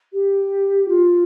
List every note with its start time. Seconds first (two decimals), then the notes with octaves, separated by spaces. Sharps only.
0.13 G4
0.88 F4